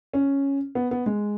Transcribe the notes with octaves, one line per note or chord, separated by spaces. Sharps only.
C#4
B3
B3
G#3